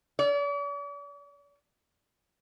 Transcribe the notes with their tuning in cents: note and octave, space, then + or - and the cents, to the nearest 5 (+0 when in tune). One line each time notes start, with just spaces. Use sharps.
D5 -45